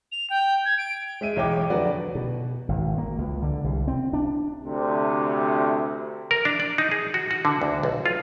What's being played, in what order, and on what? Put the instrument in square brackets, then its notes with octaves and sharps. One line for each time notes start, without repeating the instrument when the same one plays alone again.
[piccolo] F7
G5
G#6
D7
[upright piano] G#3 E5 D#7
B1 E2 C#5 G5 D6
F2 D3 F#3 F#4 B4 D5
[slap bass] B2
G#1
A#3
C#2
D3
C2
C4
D4
[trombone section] D2 C3
[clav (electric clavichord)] A#4
D4
D5
D#4
G#4
F#4
F#4
D3
D2
B1
F4